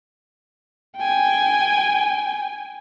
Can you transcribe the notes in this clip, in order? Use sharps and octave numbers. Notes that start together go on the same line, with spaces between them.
G5 G#5